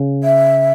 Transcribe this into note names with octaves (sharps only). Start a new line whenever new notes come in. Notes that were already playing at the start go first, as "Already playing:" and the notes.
Already playing: C#3
E5